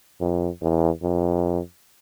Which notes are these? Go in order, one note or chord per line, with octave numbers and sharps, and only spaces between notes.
F2
E2
F2